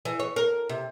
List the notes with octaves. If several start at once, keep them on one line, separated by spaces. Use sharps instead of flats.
E3
C#5
A#4
C3